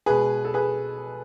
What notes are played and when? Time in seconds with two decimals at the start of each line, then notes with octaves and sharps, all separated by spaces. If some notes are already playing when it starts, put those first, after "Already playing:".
0.06 B2 G#3 G#4 B4
0.45 A4
0.54 G#4 B4